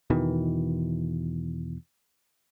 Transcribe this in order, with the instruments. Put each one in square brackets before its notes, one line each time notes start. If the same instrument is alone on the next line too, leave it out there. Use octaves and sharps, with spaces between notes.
[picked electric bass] E2 B2 D#3 E3